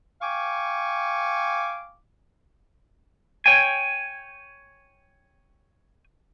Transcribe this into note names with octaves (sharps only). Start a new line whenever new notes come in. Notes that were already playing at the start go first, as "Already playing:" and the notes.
F5 G5 G#5 C#6 D6
C#5 G5 G#5